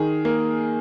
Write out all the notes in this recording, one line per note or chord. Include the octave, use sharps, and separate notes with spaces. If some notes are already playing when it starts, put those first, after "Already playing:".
Already playing: D#3 G#4
A#3